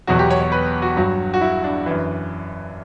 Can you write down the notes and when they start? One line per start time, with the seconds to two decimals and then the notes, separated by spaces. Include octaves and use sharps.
0.07 E2 B2 F#3 F#4
0.19 G4
0.30 C#5
0.41 C#5
0.52 B4
0.82 F#4
0.97 G2 F#3
1.34 F#4
1.41 E4
1.64 D4
1.86 F#2 E3